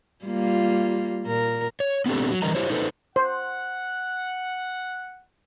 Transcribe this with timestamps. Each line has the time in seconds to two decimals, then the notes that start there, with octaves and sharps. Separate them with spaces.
0.25 G3 A#3 F4
1.24 A#2 A#4
1.80 C#5
2.06 B3 C4 D4 G4 A4
2.30 F#3
2.42 D3 E3 G3 A#4 D#5 A#5
2.55 E4 G4 C5 C#5
2.70 D#4 A4 B4 C5
3.16 C5 F#5